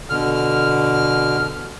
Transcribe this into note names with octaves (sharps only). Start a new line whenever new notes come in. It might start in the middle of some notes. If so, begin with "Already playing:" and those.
B2 D3 F6